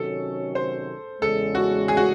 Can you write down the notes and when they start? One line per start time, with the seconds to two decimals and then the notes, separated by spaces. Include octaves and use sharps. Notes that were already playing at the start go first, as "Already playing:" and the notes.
Already playing: C3 D#3 F#3 C#4 F#4 A4
0.55 C5
1.22 E2 C#3 G#3 A4
1.55 F#4
1.88 G#4
1.97 F#4